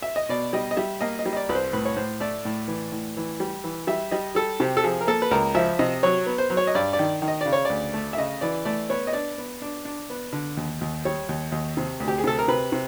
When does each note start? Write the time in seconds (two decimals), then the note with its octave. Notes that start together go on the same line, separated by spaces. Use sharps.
0.02 E5
0.16 D#5
0.29 B2 D5
0.53 G3 D#5
0.71 D#5
0.77 G3 E5
1.01 A#3 D#5
1.19 D#5
1.26 G3
1.33 D#5
1.36 D5
1.49 C2 B4
1.55 C5
1.73 A2 B4
1.85 C#5
1.97 A2 C5
2.20 A3 D5
2.45 A2
2.68 E3
2.92 A2
3.17 E3
3.40 G3
3.64 E3
3.87 G3 E5
4.11 G3 D#5
4.35 G3 A4
4.60 C3 G4
4.77 A4
4.84 F3 G#4
5.01 A#4
5.07 A#3 A4
5.22 B4
5.31 C#2 A#4
5.55 F3 E5
5.79 C3 D#5
6.03 F#3 C#5
6.26 B3
6.38 C5
6.50 F#3
6.57 C#5
6.67 D#5
6.75 G2 D5
6.93 D5
6.99 D#3
7.22 D#3
7.28 D#5
7.41 C#3 D5
7.53 C#5
7.65 D2 D5
7.94 A3
8.13 E5
8.17 C#3 D#5
8.41 E3 D5
8.65 A3 D5
8.90 B3 C#5
9.07 D#5
9.13 D4 D5
9.38 B3
9.62 D4
9.85 D4
10.10 B3
10.33 D3
10.57 D#2
10.81 D#2
11.05 G3 C#5
11.29 D#2
11.52 D#2
11.77 C3
12.00 D2
12.08 G4
12.18 G#4
12.24 C3 A4
12.39 A#4
12.48 C3 B4
12.72 C3